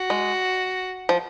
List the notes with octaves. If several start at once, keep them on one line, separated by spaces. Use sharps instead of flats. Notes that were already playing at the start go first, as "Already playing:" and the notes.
Already playing: F#4
G#3
F3